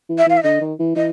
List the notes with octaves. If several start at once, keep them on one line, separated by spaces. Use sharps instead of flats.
E3
E5
E3 F5
E5
D3 D#5
D#3
E3
E3 D#5